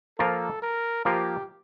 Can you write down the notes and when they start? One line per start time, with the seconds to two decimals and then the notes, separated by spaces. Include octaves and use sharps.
0.19 F3 A#3 F4 A4 A#4
0.62 A#4
1.05 F3 A#3 F4 G4 A#4